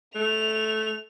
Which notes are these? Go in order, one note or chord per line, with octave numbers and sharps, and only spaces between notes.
A3 F7